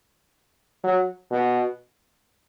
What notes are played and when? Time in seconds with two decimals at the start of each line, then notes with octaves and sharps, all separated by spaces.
0.84 F#3
1.31 B2